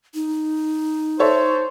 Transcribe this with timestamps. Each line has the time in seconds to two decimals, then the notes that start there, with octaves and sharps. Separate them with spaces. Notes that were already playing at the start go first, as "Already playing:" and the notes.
0.14 D#4
1.20 A4 C5 C#5 E5